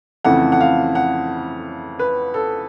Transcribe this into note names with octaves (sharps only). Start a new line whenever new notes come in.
F2 C#3 E3 A3 C4 F#5
F#5
F5
F#5
B4
A4